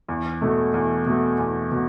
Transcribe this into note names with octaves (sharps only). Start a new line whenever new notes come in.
E2
B2 A3
E2
B2 A3
E2
B2